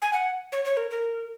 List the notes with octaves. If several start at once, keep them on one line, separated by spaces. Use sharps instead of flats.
G#5
F#5
C#5
C#5
A#4
A#4